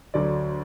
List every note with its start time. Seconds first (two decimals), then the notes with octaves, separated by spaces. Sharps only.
0.14 D2 D3 F#3 D5